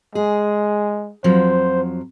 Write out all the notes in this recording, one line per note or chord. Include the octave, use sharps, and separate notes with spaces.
G#3 G#4
F2 F3 F#3 C5